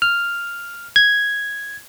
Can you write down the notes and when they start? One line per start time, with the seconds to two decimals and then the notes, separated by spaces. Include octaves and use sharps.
0.02 F6
0.96 G#6